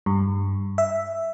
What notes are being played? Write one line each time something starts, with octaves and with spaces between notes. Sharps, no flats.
G2
E5